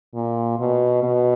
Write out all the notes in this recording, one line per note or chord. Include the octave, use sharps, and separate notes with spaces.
A#2
B2
B2